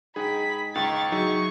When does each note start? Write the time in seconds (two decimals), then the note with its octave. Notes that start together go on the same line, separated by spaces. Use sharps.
0.16 G#2 D#4 G#4 G5 B5 B6
0.75 C#2 D#3 D#4 C#6 A6
1.12 F#3 D#4 G#4 E5 C#6